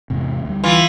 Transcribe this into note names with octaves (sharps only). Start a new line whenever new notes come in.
E2 G#2 C3
D2 G3
E3 F4